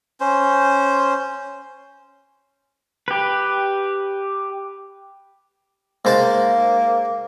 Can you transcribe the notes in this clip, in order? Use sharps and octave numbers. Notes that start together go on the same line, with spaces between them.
C#4 C5
G4 B4
G#2 A#3 C5 A5